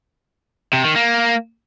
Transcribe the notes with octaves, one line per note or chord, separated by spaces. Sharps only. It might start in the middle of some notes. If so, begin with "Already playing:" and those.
C3
D#3
A#3